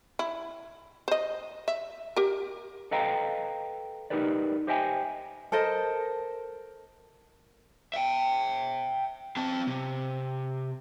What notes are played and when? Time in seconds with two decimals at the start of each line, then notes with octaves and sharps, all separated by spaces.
0.19 E4
1.08 C5 D#5
1.68 E5
2.16 G4 A#4
2.91 A4 B4 D#5 F5 G5 A#5
4.10 D#4 F#4 G4 A#4 B4 D5
4.67 G4 C5 D#5 E5 G5 G#5
5.52 A4 A#4 C5 D#5
7.94 E5 G5
9.37 C4 A5
9.67 C3